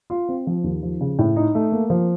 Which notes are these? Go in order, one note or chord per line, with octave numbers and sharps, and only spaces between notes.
F4
C4
F3
D#2
F3
C#3
A2
D#4
A3
A#3
F3